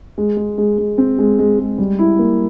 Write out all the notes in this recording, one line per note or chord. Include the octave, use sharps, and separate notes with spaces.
G#3
G#3
G#3
G#3
C4
G#3
G#3
G#3
G3
E4
A#3